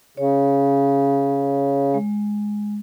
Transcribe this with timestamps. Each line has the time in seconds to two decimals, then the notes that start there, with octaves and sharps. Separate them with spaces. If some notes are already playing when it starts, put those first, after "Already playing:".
0.17 C#3 C#5
1.94 G#3